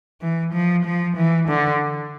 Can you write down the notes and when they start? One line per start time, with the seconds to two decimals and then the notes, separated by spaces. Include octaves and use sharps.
0.21 E3
0.54 F3
0.85 F3
1.17 E3
1.48 D3